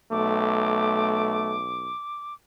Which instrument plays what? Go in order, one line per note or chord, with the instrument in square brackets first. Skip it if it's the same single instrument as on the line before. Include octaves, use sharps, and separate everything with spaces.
[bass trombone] B1 [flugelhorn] A3 [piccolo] D6